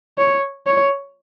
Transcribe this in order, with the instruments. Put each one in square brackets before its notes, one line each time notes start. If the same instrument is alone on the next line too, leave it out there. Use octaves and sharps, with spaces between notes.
[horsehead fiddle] C#5
C#5